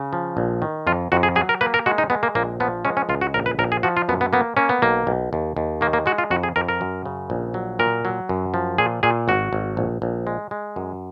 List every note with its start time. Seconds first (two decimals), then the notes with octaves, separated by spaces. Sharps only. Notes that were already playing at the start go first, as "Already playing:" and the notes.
Already playing: C#3
0.13 F3
0.37 A#1
0.62 D#3
0.87 F2 F4
1.12 F2 F#4
1.23 G#4
1.36 F#3 G#4
1.49 A#4
1.61 A#3 B4
1.74 A#4
1.86 G#3 F#4
1.98 D#4
2.10 G#3 B3
2.23 A#3
2.35 A#1 A#3
2.60 F3 B3
2.85 G#3 C#4
2.97 C#4
3.09 C#2 F4
3.21 F#4
3.34 A#1 A#4
3.46 B4
3.59 A#1 A#4
3.72 G#4
3.83 F3 F#4
3.97 F4
4.09 F#2 B3
4.21 B3
4.33 A#3 B3
4.57 A#3 C#4
4.69 B3
4.82 B1 A#3
5.07 B1
5.33 D#2
5.57 D#2
5.81 D#3 A#3
5.93 A#3
6.06 G#3 F#4
6.18 F4
6.30 F2 F#4
6.43 G#4
6.56 F2 A#4
6.69 A#4
6.81 F#2
7.06 C#3
7.30 A#1
7.54 F#3
7.79 A#2 A#4
8.05 F#3
8.29 F#2
8.54 F3
8.78 A#2 G#4
9.03 A#2 G#4
9.28 G#1 F#4
9.53 G#1
9.77 A#1
10.02 A#1
10.27 G#3
10.51 G#3
10.76 F#2